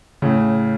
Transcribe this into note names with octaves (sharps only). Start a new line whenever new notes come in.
A2 C#3